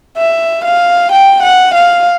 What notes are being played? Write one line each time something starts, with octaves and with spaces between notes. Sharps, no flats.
E5
F5
G5
F#5
F5